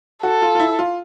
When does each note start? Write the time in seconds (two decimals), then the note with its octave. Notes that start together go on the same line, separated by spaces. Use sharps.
0.23 F#4 A4
0.42 F4
0.55 F4
0.60 E4
0.79 F4